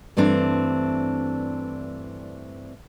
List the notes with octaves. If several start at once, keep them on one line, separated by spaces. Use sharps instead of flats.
G2 E3 A3 C4 D4